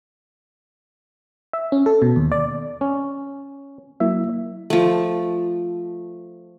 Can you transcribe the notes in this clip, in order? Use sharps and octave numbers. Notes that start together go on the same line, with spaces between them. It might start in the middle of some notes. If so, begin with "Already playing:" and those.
E5
C#4
A4
B2
D#2
D5
C#4
F#3 A#3 E4 E5
F3 A3